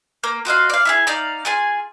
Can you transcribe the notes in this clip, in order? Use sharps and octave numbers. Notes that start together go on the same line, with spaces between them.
A#3
F4 F#4 D#5 F5
D5 F5
E4 F4 G#4
D#4 D5 F5
F4 G#4 G#5